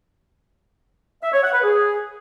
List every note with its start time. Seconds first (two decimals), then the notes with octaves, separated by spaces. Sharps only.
1.23 E5
1.33 C#5
1.43 F#5
1.53 B4
1.64 G#4